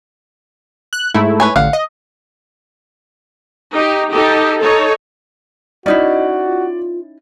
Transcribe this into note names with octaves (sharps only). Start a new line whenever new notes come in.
F#6
G#2 A3 E4
B4 C#5 G#5
A1 D3 F5 F#5
D#5
D#4 G4
D#4 G4 A4
D#4 A4 C#5
C#4 D#4 E4 F#4 D5 D#5
F4